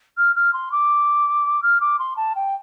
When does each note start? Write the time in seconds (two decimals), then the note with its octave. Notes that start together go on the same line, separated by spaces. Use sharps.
0.17 F6
0.35 F6
0.53 C6
0.72 D6
1.63 F6
1.80 D6
1.99 C6
2.16 A5
2.35 G5